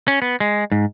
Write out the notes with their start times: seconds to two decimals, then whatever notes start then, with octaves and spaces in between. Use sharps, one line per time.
0.08 C#4
0.22 B3
0.40 G#3
0.72 G#2